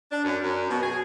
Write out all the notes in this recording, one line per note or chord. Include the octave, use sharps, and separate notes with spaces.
D4
F#2
F#2
B2
G#4